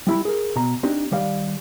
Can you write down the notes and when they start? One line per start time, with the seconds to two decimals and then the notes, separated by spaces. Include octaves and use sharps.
0.07 G3 E4 B5
0.25 G#4 A#4
0.56 B2 A#5
0.83 C4 D4 D#4 G4
1.11 D#3 G3 D5 F5